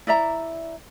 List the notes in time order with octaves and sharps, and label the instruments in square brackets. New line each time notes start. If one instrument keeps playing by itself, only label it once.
[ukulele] E4 D5 E5 A#5